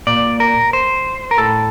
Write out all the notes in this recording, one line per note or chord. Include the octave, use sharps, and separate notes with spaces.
A#2 D5
A#4
C5
A#4
A2 A4